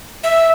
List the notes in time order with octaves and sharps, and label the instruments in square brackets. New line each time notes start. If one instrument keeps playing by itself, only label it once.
[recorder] E5